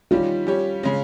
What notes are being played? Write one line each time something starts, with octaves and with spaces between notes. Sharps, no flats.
D#3 G3 C#4 F4 G4
G3 C#4 G4 C#5
C#3 G#3 C#4